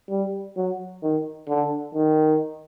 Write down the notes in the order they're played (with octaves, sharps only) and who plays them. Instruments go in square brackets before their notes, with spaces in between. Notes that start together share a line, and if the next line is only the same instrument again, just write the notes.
[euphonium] G3
F#3
D#3
D3
D#3